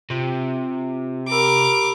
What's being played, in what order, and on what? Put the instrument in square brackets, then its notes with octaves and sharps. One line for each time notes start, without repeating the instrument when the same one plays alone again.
[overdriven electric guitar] C3 [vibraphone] F4
[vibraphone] G4 B5 E6 [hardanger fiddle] A#4 D6